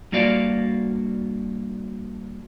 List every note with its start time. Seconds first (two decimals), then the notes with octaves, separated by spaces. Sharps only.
0.12 G2 A#3 F#4 D5 F5